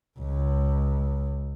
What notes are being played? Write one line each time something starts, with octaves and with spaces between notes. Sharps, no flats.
C#2